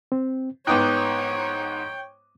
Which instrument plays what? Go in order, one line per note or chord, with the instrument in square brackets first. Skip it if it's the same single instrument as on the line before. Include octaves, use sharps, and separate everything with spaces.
[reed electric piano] C4
[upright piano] G#2 B3 D#4 [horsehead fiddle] C#5 [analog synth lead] G5 [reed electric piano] D6 D#6 F#6